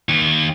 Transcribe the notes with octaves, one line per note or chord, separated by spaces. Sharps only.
D#2